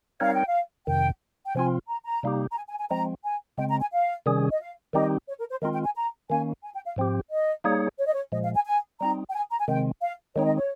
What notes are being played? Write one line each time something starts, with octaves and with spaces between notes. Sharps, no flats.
G3 C4 D#4 A#4 C#5 F5
G5
F5
F2 C3 D#3 G5
G5
C3 F3 C4 F4 G#5
A#5
A#5
C3 G3 A#3 D#4 G4
A#5
G#5
G#5
G#5
F3 G#3 C4 A#5
G#5
C#3 G#3 C4 G5
A#5
G#5
F5
C3 D#3 G3 C#4 G#4
D#5
F5
D#3 G3 C4 D#4 G4 D#5
C#5
A#4
C5
D#3 G#3 C4 F4 A#4
G5
G#5
A#5
D#3 A#3 C#4 G#5
G#5
G5
F5
G#2 F3 C4 G4
D#5
G3 A#3 D#4 G#4 C#5
C#5
D#5
C#5
A#2 F3 G#3 D#5
F5
G#5
G#5
G3 C4 D#4 A#5
G5
G#5
A#5
G#5
C3 D#3 G#3 C4 G5
F5
D#3 G#3 C4 D#4 C#5
D#5
C#5